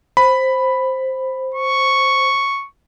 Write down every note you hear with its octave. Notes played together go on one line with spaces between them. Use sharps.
C5 B5
C#6